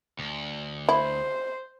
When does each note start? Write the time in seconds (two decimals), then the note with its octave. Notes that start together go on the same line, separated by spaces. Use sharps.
0.19 D2
0.89 E4 C5